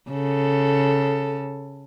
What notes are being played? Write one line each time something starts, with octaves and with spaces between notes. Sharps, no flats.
C#3 A4